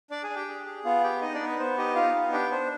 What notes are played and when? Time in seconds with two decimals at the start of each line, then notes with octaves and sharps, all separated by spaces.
0.11 D4 D5 D6
0.23 G#4 G#5
0.30 D4
0.35 G4 G5
0.48 G#4
0.66 G#4
0.85 B3 F4 F5
1.03 G4 G5
1.22 D#4 D#5
1.34 D4 D5
1.40 B3
1.46 B4
1.59 B3 C5
1.77 D#4 G4 D#5
1.95 D#4 F4 F5
2.15 B3
2.32 D4 G4 G5
2.51 D4 C5